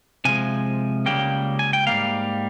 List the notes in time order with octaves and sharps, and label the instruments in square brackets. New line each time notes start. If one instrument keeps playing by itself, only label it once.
[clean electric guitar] C3 F3 G#3 G#5
C#2 C#3 G3 A#3 G5
G#5
G5
G#2 G3 A#3 F5